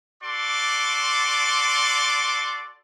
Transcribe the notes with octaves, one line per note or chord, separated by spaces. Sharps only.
F#4 A4 D5 C6 D6